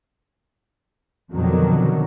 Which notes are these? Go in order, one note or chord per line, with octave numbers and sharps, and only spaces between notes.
F2 B2 D3 D#3 F#3